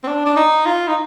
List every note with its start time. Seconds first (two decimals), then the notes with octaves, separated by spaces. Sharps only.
0.03 C4
0.07 D4
0.26 D4
0.36 D#4
0.66 F4
0.88 D#4